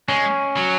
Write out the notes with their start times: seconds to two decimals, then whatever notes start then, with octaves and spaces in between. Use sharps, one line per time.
0.09 G#3 C#4
0.57 F#3